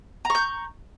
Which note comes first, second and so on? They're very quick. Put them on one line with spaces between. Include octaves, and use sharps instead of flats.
A#5 C#6 G6